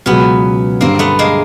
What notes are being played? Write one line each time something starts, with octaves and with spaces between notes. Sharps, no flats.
C#2 B2 F#3 B3 C#4
G2 D3 G3 A#3 C4
A3 B3
G#3 A#3